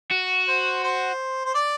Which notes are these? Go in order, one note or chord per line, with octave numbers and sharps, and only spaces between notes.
F#4
C5
C5
C5
D5